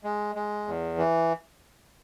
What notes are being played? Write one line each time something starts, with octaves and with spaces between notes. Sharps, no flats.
G#3
G#3
E2
E3